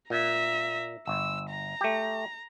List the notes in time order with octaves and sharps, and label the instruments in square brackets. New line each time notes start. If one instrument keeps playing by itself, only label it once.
[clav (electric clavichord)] A#2 [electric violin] E5 A#5
[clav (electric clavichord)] G1 [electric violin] E6
[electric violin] A#5
[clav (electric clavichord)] A3 G4